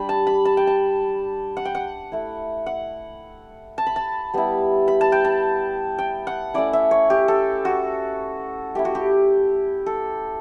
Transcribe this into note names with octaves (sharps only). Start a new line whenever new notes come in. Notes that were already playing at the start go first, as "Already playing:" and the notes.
Already playing: G3 D4 B5
A5
B5
A5
G5
A5
F#5
G5
F#5
A3 E4
F#5
A5
B5
A5
G3 B3 E4
B5
A5
G5
A5
G5
F#5
A3 C#4 E4 D5
E5
C#5
G4
A4
F#4
A3 E4 G4
F#4
G4
A4